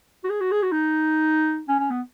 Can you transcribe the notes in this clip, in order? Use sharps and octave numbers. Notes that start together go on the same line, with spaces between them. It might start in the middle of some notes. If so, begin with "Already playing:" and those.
F#4
G#4
F#4
G#4
F#4
D#4
C#4
C#4
B3